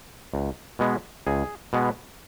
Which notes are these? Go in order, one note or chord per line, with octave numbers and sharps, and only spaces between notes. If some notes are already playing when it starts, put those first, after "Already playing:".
C#2
B2 G#3 B3
C#2 G#4
B2 G#3 B3